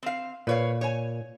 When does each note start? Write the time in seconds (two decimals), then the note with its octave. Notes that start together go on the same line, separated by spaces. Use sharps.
0.03 C4 F5
0.47 A#2 B4 C#5 F5
0.81 C#5 G#5